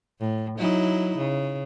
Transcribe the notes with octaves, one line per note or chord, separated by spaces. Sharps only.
A2
F#3 D#4 E4
C#3